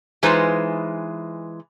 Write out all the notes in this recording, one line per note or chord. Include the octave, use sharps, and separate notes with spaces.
E3 G#3 D#4 F4 B4 C5